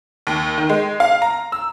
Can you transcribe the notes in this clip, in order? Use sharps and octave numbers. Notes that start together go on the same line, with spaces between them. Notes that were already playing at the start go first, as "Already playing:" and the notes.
D#2
D#3
G#3
F5
A#5
E6